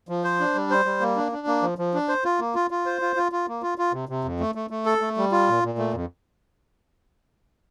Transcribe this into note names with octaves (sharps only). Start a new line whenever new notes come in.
F3
C5
D4
G3
C5
G3
A#3
D4
D4
A#3
F3
F3
D4
C5
F4
A#3
F4
F4
C5
F4
F4
F4
A#3
F4
F4
C3
C3
F2
A3
A3
A3
A4
A3
G3
F4
A#2
A#2
A3
F2